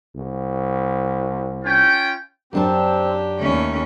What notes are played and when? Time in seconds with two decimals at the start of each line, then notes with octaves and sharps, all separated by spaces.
0.16 C2
1.65 C#4 F4 G5
2.53 F#2 C4 D4 G4 A5
3.39 D#2 A3 C#4